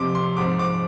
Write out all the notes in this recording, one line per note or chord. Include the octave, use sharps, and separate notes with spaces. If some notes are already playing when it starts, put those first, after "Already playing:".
Already playing: F2 C3 F3 C6 D6
C6
G#2 F3 D6
D6